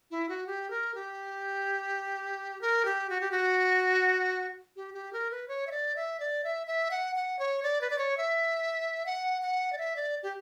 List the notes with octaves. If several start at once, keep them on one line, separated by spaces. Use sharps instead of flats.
E4
F#4
G4
A#4
G4
A#4
G4
F#4
G4
F#4
G4
G4
A#4
B4
C#5
E5
D5
E5
D5
E5
E5
F#5
F#5
C#5
D5
B4
D5
C#5
E5
F#5
F#5
D5
E5
D5
G4